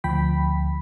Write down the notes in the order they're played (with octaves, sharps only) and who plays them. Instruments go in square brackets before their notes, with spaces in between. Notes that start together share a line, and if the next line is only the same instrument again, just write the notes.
[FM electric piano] D2 F3 G5 B5 B6